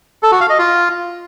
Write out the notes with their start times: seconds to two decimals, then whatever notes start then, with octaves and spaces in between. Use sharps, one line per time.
0.23 A4
0.32 F#4
0.41 F5
0.50 D#5
0.59 F4